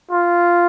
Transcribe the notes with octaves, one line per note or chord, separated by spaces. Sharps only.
F4